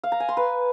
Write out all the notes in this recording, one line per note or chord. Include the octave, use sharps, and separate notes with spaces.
F5
A#5
G#5
C6
B4